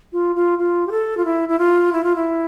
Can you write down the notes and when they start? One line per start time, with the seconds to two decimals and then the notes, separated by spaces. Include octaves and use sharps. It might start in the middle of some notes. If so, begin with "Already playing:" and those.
0.13 F4
0.36 F4
0.58 F4
0.87 G4
0.91 A4
1.17 F4
1.25 E4
1.49 E4
1.59 F4
1.93 E4
2.04 F4
2.16 E4